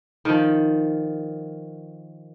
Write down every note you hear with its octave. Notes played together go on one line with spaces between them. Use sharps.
D#3 F3